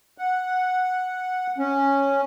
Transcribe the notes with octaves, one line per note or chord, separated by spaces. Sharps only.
F#5
C#4